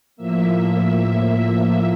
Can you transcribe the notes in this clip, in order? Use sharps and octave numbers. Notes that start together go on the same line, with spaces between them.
A2 F3 A#3 E5